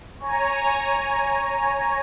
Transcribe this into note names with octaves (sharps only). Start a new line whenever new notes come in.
C#5 G#5 A#5